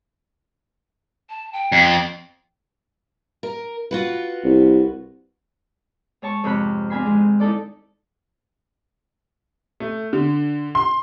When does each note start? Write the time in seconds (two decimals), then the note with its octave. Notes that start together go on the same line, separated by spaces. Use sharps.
1.30 A5
1.53 G5
1.72 F2
3.43 A#4
3.91 F4 F#4 B4
4.44 C2
6.22 G#2 C#5 A5 C#6
6.44 F2 G#2 C3 C#5 B5 F#6
6.90 C4 D4 F5 G#5 B5 C6
7.06 D#3 G#3
7.40 D#4 E4 A4 D5
9.80 A3
10.13 D3
10.75 C6